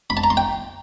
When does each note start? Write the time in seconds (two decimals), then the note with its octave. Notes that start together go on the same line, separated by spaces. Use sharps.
0.10 B5
0.17 A5
0.24 A#5
0.30 C6
0.37 G5